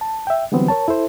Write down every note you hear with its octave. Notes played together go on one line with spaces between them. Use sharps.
A5
E5 G5
D3 E3 F#3 G3 B3 C4
A#4 C#5 A5
E4 A4 C5